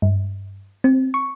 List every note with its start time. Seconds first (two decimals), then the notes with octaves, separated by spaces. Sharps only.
0.02 G2
0.84 C4
1.14 C#6